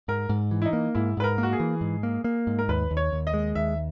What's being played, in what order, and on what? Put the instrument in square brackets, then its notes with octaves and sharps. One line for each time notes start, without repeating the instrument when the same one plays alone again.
[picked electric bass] G#2 [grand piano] A#4
[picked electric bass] G#2
E3
[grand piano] E4
D#4
[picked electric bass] A#3
[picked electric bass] G#2 [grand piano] E4
[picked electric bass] G#2 [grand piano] B4
[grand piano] A#4
[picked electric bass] A#3
[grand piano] F#4
G#4
[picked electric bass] E3
G#2
A#3
A#3
G#2
[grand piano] A#4
[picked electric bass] D#2 [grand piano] B4
[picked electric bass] D#2
[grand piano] C#5
[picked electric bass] D#2
[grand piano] D#5
[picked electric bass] G#3
[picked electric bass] D#2 [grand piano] E5